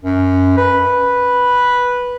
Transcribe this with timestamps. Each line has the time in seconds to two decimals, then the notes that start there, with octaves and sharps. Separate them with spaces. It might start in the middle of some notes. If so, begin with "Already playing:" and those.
0.04 F#2
0.58 B4